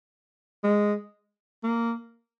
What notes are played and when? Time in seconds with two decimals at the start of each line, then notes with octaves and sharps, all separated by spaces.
0.63 G#3
1.63 A#3